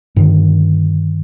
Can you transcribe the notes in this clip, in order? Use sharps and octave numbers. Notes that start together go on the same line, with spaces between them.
G2 D3 D#3